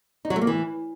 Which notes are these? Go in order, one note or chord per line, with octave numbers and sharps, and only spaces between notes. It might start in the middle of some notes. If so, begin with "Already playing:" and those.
D#4
F#3
A3
A#3
E3